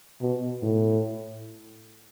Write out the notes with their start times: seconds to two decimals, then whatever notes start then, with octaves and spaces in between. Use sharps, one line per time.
0.22 B2
0.62 A2